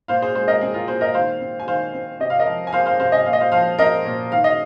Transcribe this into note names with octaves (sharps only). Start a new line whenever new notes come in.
A#2 C5 F5
G#4 C5
G#3 G#4 C5
A#4 D#5
C4 G#4
F4 A#4
A#2 G#4 C5
A#4 D#5
D#3 C5 F5
C4
G#5
D#3 C5 F5
C4
C3 D#5
F5
A#4 D#5
F3
G#5
A#3 C5 F5
C5 F5
C3 C5 F5
D#5 G#5
A#2 F5
D#5
C5 F5
F3 C5 F5
C4 A#4 D#5
A#2
D#3 F5
D#5